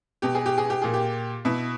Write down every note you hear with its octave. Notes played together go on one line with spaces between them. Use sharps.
B2 G4
G#4
G4
G#4
G4
A#2 G#4
G4
B2 E4